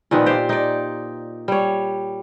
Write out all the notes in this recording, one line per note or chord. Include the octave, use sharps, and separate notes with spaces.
A#2 D#3 F3 B3
G4 C5 D5
D#4 D5
G3 C#5